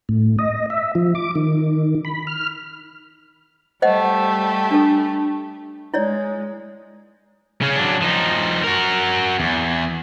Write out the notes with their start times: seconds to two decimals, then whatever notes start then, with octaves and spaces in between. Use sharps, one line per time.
0.09 A2
0.39 D#5
0.70 E5
0.95 F3
1.15 D6
1.35 D#3
2.05 B5
2.27 F6
3.82 G3 A3 G4 C5 D#5 F#5
4.71 D4 A4
5.94 G#3 E4 C#5 D5
7.62 C#3 C#4
7.76 F#3 D4
8.02 F3 D#4
8.64 F#4 A#4
9.39 E2